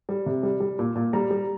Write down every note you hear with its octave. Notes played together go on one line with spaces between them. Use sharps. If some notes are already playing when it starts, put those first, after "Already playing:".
G3
C3
G3
G3
A#2
A#2
G3 A#5
G3